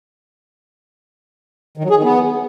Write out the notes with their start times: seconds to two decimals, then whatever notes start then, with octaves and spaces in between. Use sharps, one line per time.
1.77 D#3
1.84 F#3
1.90 G#4
1.97 D#3
2.03 B3